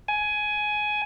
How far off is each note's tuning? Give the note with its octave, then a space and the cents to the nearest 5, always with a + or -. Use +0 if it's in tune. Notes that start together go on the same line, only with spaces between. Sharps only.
G#5 +15